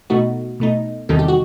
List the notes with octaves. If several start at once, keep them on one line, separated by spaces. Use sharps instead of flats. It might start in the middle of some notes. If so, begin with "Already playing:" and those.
B2 A3 D#4 F#4
B2 A3 D#4
E2 C3 D#3 G3 D#4 A4
G4
F#4